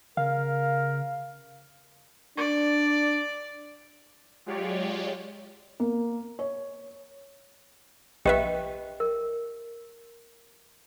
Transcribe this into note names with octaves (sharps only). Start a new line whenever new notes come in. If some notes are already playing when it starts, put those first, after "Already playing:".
C#3 A#4 F5
D4 D5
F#3 G#3 F4 G4 C#5 D5
A#3
C#5
A#1 G4 B4 D#5 E5 G5
A#4